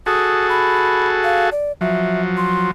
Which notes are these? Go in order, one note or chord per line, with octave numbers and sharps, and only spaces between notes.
F#4 G#4 A4 D#6
B5
F5
D5
F3 F#3 E5
C6